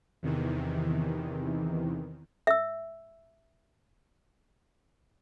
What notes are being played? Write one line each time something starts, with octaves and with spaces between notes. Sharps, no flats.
E2 C3 D#3 E3
E5 E6